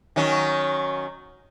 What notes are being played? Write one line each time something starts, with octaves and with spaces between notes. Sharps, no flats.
D#3 F#3 C#4